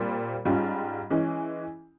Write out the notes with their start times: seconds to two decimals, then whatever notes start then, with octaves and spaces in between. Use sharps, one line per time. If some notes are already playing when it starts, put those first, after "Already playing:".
Already playing: A#2 G3 C4 F4
0.45 G#2 G3 C#4 F4
1.10 E3 G#3 C#4